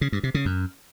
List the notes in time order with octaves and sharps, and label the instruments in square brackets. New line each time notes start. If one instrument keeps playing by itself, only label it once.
[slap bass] C#3
G2
C3
C#3
F#2